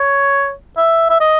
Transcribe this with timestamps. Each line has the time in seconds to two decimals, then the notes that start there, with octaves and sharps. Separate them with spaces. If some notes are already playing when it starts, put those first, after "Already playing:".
Already playing: C#5
0.77 E5
1.09 E5
1.20 D#5